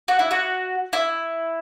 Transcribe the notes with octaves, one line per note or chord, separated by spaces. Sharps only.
F#4
E4
F#4
E4